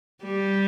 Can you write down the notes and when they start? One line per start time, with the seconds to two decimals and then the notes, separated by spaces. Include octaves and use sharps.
0.24 G3